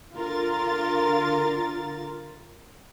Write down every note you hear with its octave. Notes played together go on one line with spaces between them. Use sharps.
D3 F4 A#4 A6